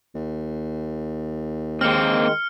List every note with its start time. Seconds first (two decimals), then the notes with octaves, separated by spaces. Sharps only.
0.15 D#2
1.81 D#3 G#3 A#3 C4 F6 C#7